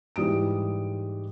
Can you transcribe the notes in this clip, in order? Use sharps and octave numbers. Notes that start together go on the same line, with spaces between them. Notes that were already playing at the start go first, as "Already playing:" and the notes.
G#2 E3 G3 D#6 D7